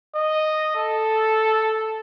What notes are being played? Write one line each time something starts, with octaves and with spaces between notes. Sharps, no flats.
D#5
A4